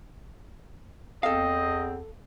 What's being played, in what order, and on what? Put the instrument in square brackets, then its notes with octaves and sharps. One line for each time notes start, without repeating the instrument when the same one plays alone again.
[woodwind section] E2 C4 [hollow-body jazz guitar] A4 F5 [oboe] D#5